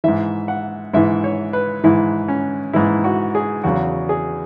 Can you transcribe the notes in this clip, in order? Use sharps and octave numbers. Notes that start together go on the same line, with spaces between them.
G#2 E3 E5
F#5
G#2 E3 E5
C#5
B4
G#2 E3 E4
C#4
G#2 E3 E4
F#4
G#4
E2 C#3 F#3 F#4
G#4